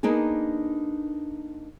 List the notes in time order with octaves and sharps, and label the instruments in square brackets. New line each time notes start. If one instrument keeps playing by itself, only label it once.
[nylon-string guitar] A#3 B3 D4 D#4 G#4